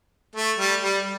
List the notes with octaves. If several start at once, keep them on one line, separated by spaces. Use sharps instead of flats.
A3
G3
G3